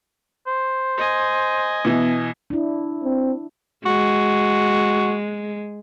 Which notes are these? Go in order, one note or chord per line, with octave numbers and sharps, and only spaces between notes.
C5
D#5 G#5
B2 E3 B3
D4 E4
C4
G#3 F#4